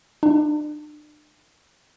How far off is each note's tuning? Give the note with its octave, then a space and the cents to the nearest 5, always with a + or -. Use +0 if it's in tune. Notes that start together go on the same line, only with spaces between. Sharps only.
D4 +40